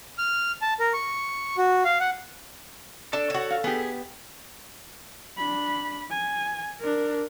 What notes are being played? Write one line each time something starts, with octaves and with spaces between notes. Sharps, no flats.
F6
A5
A#4
C#6
F#4
F5
F#5
D4 A4 A5
F#4 C#5
F5
B3 G4 G#4
D4 B5
G#5
D4 A#4